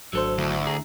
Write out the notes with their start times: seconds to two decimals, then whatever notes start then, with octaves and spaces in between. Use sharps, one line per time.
0.13 G#1 D2 F#3 A4 C5 E6
0.38 D2 E4
0.67 G#4 A#5